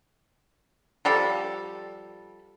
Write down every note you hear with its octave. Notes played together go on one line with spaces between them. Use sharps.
F3 G3 A4